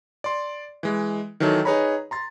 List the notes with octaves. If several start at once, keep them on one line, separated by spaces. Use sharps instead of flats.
D5 C6
E3 G#3
D#3 E3 F#3 D#4 A4
D#4 G#4 B4 C#5 A#5 B5
A#5 C6 A6